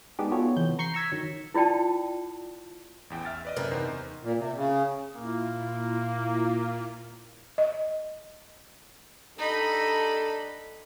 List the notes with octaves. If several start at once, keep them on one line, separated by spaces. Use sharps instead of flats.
G#3 B3 D4 D#4 G4 G#4
B3 F4 F#4 A4 C#5
C3 E3 G6
A#5 C#6 G6 C7
A#5 C#6 E6 G#6 B6
D#3 F#3
E4 F4 D5 G5 A5
A1 E2 G5
E5 F6 A6
B4 D5 D#5
F#2 C3 A#4 B4
E2 D#4 C5
A#2
C3
C#3
A#2 A#3 E4 F4
D#5
D4 D#4 G4 A4 B5